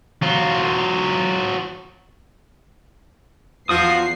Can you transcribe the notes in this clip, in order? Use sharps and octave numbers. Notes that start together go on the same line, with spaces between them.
F#3 F4
E2 F3 F4 F#4 D#6 C7